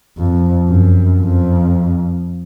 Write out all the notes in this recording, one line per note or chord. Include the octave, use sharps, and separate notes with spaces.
F2
F#2
F2